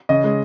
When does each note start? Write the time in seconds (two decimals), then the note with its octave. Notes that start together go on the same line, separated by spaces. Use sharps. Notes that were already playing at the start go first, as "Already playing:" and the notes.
0.09 C#3 D#5
0.24 G#3